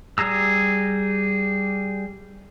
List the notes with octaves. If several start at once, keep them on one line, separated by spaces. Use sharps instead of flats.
G3 G#4 A#5 E6